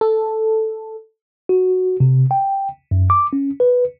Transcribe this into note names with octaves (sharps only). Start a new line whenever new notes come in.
A4
F#4
C3
G5
F#2
D6
C#4
B4